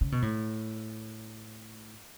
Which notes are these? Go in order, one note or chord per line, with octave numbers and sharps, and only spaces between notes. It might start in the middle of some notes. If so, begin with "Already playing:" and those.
C#3
B2
A2